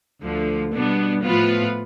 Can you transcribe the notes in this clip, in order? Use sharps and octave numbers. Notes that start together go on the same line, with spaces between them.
D2 D3 F3
B2 G3 B3 D4
A2 F3 B3 F4 B4